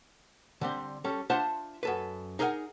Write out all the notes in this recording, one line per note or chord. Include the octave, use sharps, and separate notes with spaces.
D3 G3 C4
G3 C#4 A4
D4 F4 C5 E5 F#5 A5
F#2 A4 B4
D#4 G#4 A#4 F5 F#5 G#5